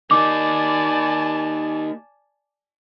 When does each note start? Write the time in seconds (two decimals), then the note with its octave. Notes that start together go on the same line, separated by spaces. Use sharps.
0.11 A#3 D#4 D5 G#5 A5 D6